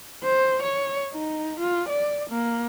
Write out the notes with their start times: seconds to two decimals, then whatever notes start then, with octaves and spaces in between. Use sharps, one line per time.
0.24 C5
0.63 C#5
1.13 D#4
1.60 F4
1.89 D5
2.30 A#3